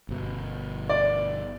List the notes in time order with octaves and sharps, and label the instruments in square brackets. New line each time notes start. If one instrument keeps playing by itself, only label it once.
[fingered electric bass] G1 B2
[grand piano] D5